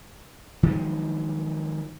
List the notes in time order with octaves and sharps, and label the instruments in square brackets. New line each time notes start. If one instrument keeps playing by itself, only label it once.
[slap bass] D#3 F3 F#3 G#3